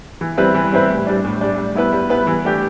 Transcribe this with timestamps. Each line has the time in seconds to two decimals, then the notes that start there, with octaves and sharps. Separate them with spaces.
0.21 E3
0.37 G3 C4 E4 B4
0.54 E3
0.72 G3 C4 E4 B4
0.89 A2
1.07 G3 D4
1.24 A2
1.41 G3 D4
1.58 G3
1.75 B3 E4 B4
1.92 G3
2.10 B3 E4 B4
2.27 E3
2.45 A3 D4 G4